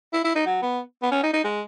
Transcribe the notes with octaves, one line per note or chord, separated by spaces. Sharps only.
E4
E4
D#4
F#3
B3
B3
C#4
D#4
D#4
G#3